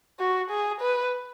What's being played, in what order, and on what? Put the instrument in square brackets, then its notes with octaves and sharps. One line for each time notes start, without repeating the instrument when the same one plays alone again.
[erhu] F#4
G#4
B4